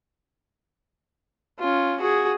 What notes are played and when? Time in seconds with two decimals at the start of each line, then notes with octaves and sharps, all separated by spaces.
1.59 C#4 F4
2.00 F#4 G#4